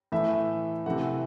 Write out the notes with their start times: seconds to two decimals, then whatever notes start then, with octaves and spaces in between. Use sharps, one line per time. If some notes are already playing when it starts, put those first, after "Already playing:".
0.12 A2 E3 A3 E5
0.86 C3 E3 A3 F#5